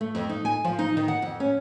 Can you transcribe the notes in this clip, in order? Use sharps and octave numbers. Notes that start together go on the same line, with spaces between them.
A3
F2
D#4
G#5
F3
D#4
D#3
F#5
F2
C#4